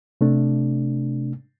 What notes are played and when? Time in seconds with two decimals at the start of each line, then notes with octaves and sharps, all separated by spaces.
0.21 C3 A3 D4